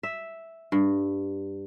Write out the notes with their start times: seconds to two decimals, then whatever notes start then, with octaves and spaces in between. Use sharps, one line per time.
0.03 E5
0.72 G2